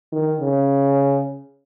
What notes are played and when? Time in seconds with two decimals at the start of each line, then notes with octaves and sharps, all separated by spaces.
0.12 D#3
0.41 C#3